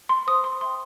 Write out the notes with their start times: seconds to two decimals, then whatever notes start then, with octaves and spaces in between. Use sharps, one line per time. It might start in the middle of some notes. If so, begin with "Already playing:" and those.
0.09 C6
0.27 C5 D#6
0.44 C6
0.61 E5 G5 C6